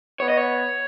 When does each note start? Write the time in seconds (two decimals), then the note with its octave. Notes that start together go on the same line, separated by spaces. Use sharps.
0.20 B3 C#5
0.29 D#5
0.37 C#5